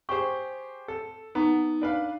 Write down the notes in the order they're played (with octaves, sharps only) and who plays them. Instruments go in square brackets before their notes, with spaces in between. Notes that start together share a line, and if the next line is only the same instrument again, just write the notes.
[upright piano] G4 G#4 C5 [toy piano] C#6
[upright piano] A4
[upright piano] B3 [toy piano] D#4 G#4 A#5
[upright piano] D4 B4 F5